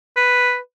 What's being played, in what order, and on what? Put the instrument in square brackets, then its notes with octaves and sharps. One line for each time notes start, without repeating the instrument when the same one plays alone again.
[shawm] B4